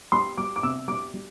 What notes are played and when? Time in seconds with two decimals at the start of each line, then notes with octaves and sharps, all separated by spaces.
0.12 G3 C6
0.37 G3 D6
0.56 D6
0.63 C3 E6
0.88 G3 D6
1.14 G3